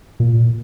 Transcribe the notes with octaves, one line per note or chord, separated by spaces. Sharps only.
A#2